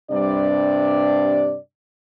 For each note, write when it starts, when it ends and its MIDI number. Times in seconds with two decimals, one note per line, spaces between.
0.11 1.57 43
0.11 1.57 48
0.11 1.57 55
0.11 1.57 62
0.11 1.57 74